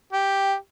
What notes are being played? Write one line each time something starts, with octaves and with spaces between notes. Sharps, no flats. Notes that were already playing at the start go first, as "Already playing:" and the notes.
G4